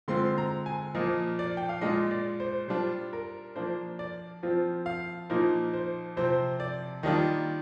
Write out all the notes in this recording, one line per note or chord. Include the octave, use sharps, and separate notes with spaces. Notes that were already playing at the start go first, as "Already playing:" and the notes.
D3 G#3 C4 F4 C6
A#5
G#5
A#2 F3 A#3 D#5
D5
G5
F5
A#2 G#3 D4 F4 D#5
D5
C5
G3 D4 F4 C5
A#4
F3 A#3 D4 C5
D5
F3 C4 F4
F5
A#2 F3 A#3 D#4 C5
C5
C3 F3 C4 C5
D5
D#3 G3 A#3 D4 F4 D#5